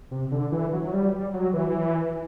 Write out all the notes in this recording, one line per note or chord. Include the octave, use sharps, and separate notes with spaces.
C3
D3
E3
F#3
F#3
G3
G3
F#3
E3